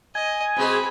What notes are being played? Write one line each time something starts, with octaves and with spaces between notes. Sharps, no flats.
D#5 G#5
B2 G#3 C4 G#4 B5